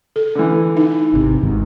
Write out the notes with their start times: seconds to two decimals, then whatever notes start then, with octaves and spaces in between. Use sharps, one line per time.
0.16 A4
0.35 D3 E3
0.77 D#4
1.14 G#1 C3
1.42 G#1 G#2 D#3